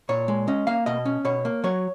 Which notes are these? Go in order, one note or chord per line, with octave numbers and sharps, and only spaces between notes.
A#2 C#5
G#3
C#4 D#5
A#3 F5
B2 D#5
C#4
B2 C#5
A#3
F#3 C#5